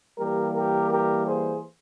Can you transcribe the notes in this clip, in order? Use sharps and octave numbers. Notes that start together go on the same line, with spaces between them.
E3 G3 A#3 G4 A#4
G4 A#4
G4 A#4
G#4 C5